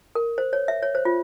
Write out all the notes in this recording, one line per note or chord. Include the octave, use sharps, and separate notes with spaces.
A#4
C5
C#5
E5
C#5
C5
F4